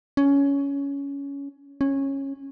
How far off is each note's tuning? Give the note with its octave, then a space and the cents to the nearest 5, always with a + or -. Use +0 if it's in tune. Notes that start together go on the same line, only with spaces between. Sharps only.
C#4 +15
C#4 -15